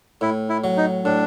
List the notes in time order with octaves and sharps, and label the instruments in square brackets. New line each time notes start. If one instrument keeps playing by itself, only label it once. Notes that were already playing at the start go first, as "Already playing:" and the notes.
[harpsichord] A2 [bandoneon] E4
[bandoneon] E4
[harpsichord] F#3
[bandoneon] D#4
[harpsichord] A2 [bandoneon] D4